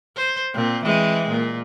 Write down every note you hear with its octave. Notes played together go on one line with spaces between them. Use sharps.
C5
A#2 C4
E3 G#3 C4
A#2